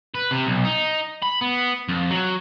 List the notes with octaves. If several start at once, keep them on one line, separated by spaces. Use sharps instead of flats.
B4
C3
B1
D#4
B5
B3
F2
F#3